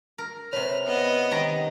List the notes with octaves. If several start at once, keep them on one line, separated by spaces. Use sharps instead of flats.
A#4
C3 B4 C#5 F6
B3 D#5
D#3 G4 A#5